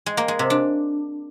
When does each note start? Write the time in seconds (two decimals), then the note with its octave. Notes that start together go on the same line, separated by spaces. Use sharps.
0.06 G#3
0.17 A#3
0.28 G#3
0.39 C3
0.50 D4